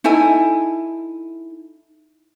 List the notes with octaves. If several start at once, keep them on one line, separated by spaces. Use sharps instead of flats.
D#4 E4 A4 G#5